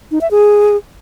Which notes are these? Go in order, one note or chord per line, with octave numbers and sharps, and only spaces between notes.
D#4
E5
G#4